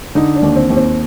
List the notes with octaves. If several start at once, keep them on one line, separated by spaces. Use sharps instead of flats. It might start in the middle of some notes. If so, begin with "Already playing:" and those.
D3 D#4
D4
D#2
C4
D#2
C4